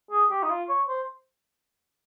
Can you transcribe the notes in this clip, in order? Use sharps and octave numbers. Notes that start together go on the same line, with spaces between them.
G#4
G4
D#4
F4
C#5
C5